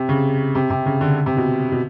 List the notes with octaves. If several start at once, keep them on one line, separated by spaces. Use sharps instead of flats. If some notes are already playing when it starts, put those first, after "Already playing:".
Already playing: C3
C#3
C3
C3
C#3
D3
C3
B2
B2